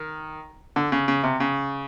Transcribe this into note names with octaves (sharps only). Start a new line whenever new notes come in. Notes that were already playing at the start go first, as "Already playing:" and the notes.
Already playing: D#3
D3
C#3
C#3
C3
C#3